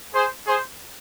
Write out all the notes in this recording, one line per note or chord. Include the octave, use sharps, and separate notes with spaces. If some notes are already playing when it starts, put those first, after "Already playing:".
G#4 C5
G#4 C5